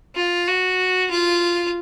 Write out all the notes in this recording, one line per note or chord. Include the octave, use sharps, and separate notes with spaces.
F4
F#4
F4